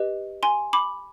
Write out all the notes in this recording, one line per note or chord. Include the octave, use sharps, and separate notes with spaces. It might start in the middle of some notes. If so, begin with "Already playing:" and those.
Already playing: G4 B4 D#5
G#5 C6
B5 D6